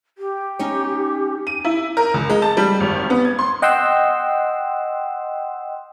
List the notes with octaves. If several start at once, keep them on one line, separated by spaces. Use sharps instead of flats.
G4
C#4 D#4 C#5
D#7
E4
A#4
C#2
G#3
A5
G3
G#1
B3
G#6
C6
D#5 F#5 G5 C6 E6